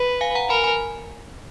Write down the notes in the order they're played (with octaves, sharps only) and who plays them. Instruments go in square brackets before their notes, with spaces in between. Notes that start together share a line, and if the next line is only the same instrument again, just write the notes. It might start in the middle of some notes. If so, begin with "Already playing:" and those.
Already playing: [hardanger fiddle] B4
[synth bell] F5 G#5
F#5 A#5
[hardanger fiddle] A#4 [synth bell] G#5 B5
[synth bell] G#5 B5